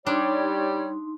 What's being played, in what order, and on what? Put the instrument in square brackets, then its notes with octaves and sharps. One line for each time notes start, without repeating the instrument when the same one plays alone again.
[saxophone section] G3 [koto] D4 [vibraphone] D#4 C6 [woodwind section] C#5